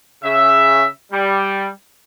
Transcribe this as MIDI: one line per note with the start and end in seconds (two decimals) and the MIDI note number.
0.24 0.86 49
0.24 0.86 76
1.12 1.68 55